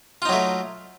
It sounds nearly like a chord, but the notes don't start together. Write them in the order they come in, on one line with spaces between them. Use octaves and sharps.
F4 D#4 F#3 A3